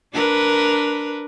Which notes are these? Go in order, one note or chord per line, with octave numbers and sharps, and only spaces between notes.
D4 A#4 B4